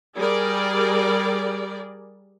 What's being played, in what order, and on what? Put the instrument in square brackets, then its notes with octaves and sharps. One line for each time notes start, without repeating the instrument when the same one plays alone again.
[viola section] G3 G#4 A#4 D5